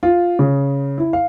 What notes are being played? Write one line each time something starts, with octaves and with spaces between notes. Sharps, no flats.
F4
C#3
E4
F5